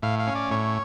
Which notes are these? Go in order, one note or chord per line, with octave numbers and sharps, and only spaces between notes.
A2 F5
F5
C#4
D5
A2 C#5